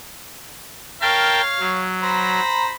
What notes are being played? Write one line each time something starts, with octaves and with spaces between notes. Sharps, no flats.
A#4 C#5 F5 G5 A5
F#3
C5 A#5 B5